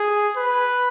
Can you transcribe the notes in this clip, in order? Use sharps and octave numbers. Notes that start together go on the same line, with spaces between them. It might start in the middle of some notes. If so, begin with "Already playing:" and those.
Already playing: G#4
B4